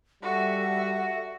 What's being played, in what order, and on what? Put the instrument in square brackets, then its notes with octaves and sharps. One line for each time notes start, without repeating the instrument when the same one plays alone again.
[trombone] G3 [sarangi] F#4 [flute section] A4 E5 F#5